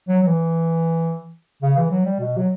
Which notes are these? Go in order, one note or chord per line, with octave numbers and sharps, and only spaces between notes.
F#3
F#3
E3
C#3
E3
F#3
G3
B2
F#3